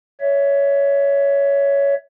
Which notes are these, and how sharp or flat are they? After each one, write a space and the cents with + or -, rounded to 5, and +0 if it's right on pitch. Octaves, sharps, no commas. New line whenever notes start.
C#5 +15 E5 +0